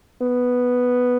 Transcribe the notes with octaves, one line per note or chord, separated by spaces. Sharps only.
B3